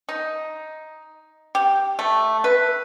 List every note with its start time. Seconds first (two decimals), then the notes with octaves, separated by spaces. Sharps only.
0.09 D#4
1.55 G4
1.99 A3
2.44 B4